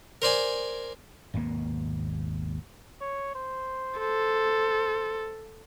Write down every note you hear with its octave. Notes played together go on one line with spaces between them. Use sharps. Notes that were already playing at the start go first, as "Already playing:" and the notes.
A#4 C5 D5 G#5
G#1 D#2 B2 A#3
C#5
C5
A4 C5